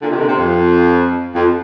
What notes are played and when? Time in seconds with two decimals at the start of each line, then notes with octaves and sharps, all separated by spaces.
0.02 A#2 D3
0.11 C3 D#3
0.20 A#2 D3
0.29 C3
0.37 F2
1.35 F2